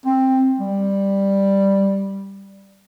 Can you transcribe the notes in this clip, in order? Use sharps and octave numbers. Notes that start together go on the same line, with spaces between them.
C4
G3